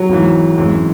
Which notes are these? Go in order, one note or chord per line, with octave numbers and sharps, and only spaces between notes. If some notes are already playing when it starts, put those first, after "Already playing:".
Already playing: F#3
G#1 G#2 E3
G#1 F#2 E3 G#3